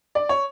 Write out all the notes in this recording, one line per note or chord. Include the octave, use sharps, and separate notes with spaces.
D5
C#5